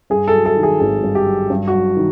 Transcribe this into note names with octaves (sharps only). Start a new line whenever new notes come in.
G2 G#4
A4
F#3
A4
D#3
G#4
G#1 G#4
G2
G4
F#3
G2
F#4
F#3
D#3